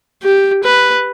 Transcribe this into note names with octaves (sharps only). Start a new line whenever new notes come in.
G4
B4